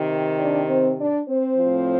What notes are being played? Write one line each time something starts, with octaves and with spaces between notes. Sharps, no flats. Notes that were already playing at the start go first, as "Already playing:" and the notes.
Already playing: C3 D#3
D4 D5
C4 C5
D4 D5
C4 C5
F3
A2